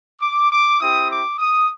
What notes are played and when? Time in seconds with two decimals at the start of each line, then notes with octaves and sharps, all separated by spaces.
0.21 D6
0.50 D6
0.80 C4 E4 G4 D#6
1.10 D6
1.38 D#6